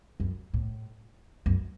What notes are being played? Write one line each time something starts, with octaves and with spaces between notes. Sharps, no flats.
F#2
A2
F#2